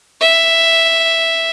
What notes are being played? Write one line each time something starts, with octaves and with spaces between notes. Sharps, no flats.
E5